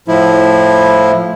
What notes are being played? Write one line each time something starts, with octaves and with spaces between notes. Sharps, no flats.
A2 F3 E4